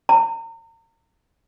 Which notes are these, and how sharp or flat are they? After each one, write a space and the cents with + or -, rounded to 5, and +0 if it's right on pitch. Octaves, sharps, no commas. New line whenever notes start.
A#5 -35